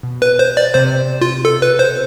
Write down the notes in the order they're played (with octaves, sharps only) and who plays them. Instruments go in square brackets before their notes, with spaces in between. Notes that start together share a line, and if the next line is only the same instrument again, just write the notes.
[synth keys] B2
[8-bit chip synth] B4
C5
D5
[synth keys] C3 [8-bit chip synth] C5
[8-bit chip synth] F4
A4
B4
C5